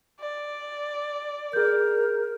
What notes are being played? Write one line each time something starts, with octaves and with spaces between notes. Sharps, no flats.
D5
G#4 A#4 G6